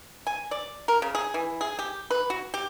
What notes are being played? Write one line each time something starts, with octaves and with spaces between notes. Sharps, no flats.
G#5
D5
A#4
C#3
G#4
E3
G#4
G4
B4
F#4
G4